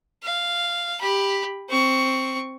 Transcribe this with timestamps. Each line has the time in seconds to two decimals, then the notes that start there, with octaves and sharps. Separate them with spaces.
0.23 F5
1.01 G4 B5
1.69 C4 C#6